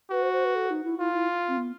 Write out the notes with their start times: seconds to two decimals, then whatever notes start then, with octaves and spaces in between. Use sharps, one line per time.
0.10 F#4 B4
0.22 C5
0.33 C5
0.45 B4
0.55 A4
0.70 D#4
0.84 E4
0.99 E4 F4
1.14 E4
1.48 C4
1.57 B3